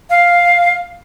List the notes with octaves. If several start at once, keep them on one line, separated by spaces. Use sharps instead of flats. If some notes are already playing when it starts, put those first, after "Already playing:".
F5